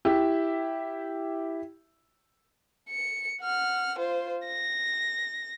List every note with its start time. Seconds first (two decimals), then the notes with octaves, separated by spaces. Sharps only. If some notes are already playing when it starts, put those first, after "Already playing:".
0.05 E4 G4 E5
2.90 C#7
3.42 F#5 F6
3.99 F4 C5
4.46 A#6